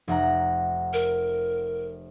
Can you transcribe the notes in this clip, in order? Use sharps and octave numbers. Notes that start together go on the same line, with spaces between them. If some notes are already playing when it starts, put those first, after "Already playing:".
F1 F#5 A#5
A#4